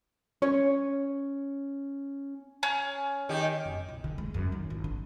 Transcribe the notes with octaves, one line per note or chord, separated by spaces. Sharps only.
C#4 C#5
C#4
D#3 D#4 G4
F#2
B1
D3
G#3
F#2
D#3
G#1
D4